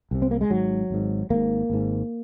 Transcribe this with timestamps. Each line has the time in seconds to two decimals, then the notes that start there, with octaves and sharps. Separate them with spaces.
0.11 C2 C3
0.22 C4
0.31 A#3
0.41 G#3
0.50 G#1 G#2 F#3
0.90 G#1 G#2
1.30 G#1 G#2 A#3
1.70 G#1 G#2